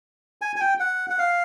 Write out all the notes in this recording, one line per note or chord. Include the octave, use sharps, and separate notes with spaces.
G#5
G#5
G5
F#5
F#5
F5